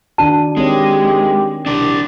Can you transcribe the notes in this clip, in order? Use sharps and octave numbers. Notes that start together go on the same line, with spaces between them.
D#3 D4 F#4 A5
D#2 D#3 G#3 C4 D#4 G4 C#5
C2 D4 A#4